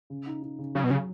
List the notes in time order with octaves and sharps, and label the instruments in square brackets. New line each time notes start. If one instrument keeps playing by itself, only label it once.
[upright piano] C#3
D#4
D#4
C#3
[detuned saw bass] C#3 [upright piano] F#3
[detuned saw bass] B2
[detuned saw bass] C#3 [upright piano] F#3